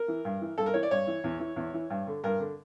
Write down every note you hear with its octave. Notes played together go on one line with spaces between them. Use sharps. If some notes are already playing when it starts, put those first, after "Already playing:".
Already playing: A#4
E3
G2
E3
G2 A4
A#4
E3 C#5
D5
G2 C#5
E3
E2
E3
E2
E3
G2
D3
G2 A#4
D3